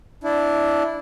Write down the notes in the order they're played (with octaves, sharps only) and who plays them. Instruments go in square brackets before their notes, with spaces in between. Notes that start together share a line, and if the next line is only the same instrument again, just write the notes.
[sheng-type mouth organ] D4 E4